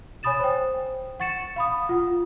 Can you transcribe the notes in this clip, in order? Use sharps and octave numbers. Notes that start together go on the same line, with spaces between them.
C#5 G#5 B5 D#6 A6 E7
C5 G5
F#5 C#6 A6 C#7 E7
F5 B5 D#6
F4 F#5